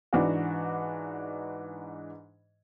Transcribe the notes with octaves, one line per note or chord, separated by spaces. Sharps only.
G#2 E3 D4 F#4